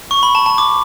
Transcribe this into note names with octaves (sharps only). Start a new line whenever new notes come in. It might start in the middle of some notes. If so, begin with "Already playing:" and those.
C#6
B5
A5
A5
D6